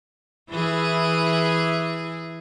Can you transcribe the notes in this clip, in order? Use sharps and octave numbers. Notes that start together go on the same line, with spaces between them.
E3 E4 G#4